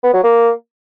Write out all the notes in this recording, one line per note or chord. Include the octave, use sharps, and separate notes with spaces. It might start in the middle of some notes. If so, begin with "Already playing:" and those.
B3
F#3
A#3